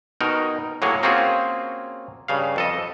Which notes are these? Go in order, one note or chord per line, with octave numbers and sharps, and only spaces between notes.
B2 D#3 D#4 A#4
A2 F#3 A#3 G#4 C#5
A#3 C4 C#4 F4 F#4 G#4
G2 C#3 F5
F2 A4 D#5